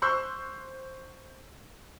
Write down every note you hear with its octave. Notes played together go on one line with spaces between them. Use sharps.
C5 C6 C#6 E6 F#6 G6